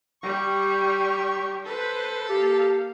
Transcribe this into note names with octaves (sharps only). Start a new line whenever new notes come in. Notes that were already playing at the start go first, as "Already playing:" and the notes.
G3 G4 C#6
A4 B4 C5
A#3 G4 F5